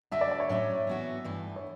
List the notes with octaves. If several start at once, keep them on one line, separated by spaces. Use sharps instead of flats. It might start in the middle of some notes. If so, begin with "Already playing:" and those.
D3 A3 D4 F#4 E5
D5
D5
C#5
A2 F#3 C#4 E5
E3 B3 F#4
G2 E3 A3
C#5